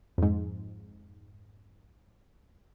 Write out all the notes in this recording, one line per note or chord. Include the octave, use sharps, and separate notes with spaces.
F2 G#2